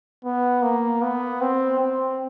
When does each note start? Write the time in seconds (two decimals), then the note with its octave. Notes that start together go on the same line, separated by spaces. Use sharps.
0.25 B3
0.63 A#3
1.02 B3
1.41 C4
1.80 C4